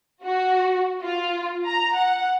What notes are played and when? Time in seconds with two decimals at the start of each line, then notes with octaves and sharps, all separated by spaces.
0.23 F#4
1.01 F4
1.66 A#5
1.96 F#5